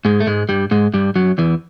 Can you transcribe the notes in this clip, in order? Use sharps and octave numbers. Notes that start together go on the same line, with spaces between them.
G#2 G#3
A3
G#2 G#3
G2 G3
G#2 G#3
G2 G3
F#2 F#3
E2 E3